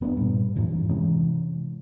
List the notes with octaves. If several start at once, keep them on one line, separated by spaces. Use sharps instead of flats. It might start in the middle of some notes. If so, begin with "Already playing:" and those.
F#1 B3 C#4 D4
G2 A#2
F2 G#2 D#3 E3
C3 E3 G#3 C#4